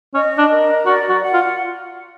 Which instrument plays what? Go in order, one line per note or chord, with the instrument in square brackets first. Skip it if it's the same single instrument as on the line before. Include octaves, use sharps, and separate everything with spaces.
[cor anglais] C#4 [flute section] D#5
[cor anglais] D4
[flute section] A#4
[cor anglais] F#4 [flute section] D5
[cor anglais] F#4
[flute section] F#5
[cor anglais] F4